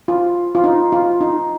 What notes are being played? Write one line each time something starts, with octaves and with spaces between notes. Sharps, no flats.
F4
F4
D#4
F4
D#4